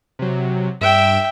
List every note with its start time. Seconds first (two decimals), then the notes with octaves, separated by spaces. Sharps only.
0.19 C3 F#3
0.81 G2 E5 G5 D7 E7